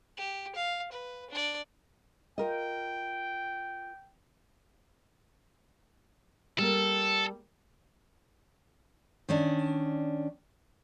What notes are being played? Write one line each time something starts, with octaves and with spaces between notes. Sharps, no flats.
G4
F5
B4
D4 D5
F4 A#4 D#5 G5
G3 A#3 A4
D#3 C#4 D4